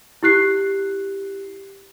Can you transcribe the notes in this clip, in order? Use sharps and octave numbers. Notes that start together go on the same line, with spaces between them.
E4 G4 F#6 C7